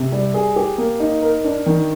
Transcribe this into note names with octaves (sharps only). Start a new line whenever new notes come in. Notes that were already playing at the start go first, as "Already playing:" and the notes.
Already playing: C3
G3
G#4
G4
A#3
D#4
A#4
D4
D#3